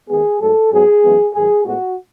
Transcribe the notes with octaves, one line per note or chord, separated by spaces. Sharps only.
D#2 D#3 G#3 B3 G#4
G#2 F#3 A3 A4
G#2 F#3 B3 G#4
F#2 E3 G#3 B3
G#2 D#3 F#3 G#4
A2 G#3 B3 F#4